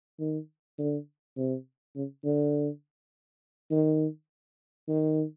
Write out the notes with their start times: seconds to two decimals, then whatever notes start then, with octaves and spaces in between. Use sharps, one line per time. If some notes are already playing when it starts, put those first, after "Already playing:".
0.20 D#3
0.78 D3
1.37 C3
1.96 C#3
2.25 D3
3.71 D#3
4.88 D#3